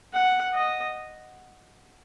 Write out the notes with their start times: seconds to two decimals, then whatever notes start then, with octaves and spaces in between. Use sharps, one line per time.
0.13 F#5
0.54 D#5